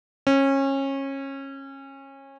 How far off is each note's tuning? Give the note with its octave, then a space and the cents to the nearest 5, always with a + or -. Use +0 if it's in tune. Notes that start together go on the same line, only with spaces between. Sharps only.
C#4 -25